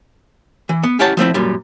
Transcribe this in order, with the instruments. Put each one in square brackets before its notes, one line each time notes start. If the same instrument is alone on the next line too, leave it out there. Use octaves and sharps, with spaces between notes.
[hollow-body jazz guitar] E3
B3
C#4 E4 G4 C#5 F#5 A5
F3 A3 C4 E4
F#2 A#2 G3